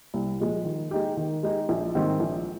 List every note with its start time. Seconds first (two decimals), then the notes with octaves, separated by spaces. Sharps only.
0.14 C2
0.40 A#2 F3 G#3
0.65 D#3
0.91 G#3 D#4 G4
1.17 D#3
1.43 G#3 D#4 G4
1.69 A#1
1.95 G#2 D#3 G3 C4
2.20 A#1